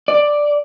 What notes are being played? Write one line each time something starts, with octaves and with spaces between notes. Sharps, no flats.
D5